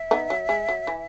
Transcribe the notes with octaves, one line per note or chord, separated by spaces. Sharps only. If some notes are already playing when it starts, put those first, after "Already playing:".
Already playing: E5
B3 D#4
F#3
G#3
F#3
E3